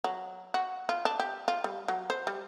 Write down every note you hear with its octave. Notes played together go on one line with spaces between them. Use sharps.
F#3
F#4
F4
D4
G4
F4
G3
F#3
C5
G3